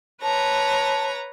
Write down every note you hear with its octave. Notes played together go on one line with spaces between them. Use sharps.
B4 C#5 A5 A#5